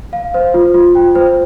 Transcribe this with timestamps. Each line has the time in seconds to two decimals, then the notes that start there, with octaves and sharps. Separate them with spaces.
0.13 F5
0.34 C5
0.54 F4
0.74 F4
0.95 G5
1.15 C5